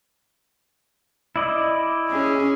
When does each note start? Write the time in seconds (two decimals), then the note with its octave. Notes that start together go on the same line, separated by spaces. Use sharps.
1.36 E4 D5 D#5
2.10 C#4 G#4